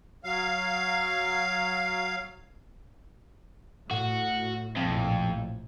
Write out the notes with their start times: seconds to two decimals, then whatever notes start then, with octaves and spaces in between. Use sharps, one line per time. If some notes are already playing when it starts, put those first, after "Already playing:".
0.24 F#3 F5
3.91 A2 F#4
4.77 A#1 F2 A2 C3